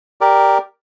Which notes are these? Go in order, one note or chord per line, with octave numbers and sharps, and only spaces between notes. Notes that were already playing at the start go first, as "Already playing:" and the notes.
G4 A#4 D5